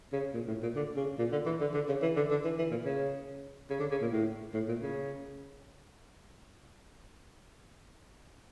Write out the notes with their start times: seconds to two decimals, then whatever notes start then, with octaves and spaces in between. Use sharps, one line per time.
0.13 C#3
0.34 A#2
0.48 A2
0.63 A#2
0.76 D3
0.97 C#3
1.18 A#2
1.32 D3
1.46 E3
1.60 D3
1.74 D3
1.88 C#3
2.02 E3
2.16 D3
2.30 D3
2.44 E3
2.58 E3
2.71 A#2
2.85 C#3
3.70 C#3
3.80 D3
3.91 C#3
4.01 A#2
4.12 A2
4.54 A2
4.68 A#2
4.82 C#3